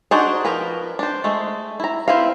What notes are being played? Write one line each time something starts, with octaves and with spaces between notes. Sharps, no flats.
D4 D#4 F#4 G#4 C5
F3 A#4 B4
D4 C5
G#3 A3
E4 A#5
C4 E4 B4 F5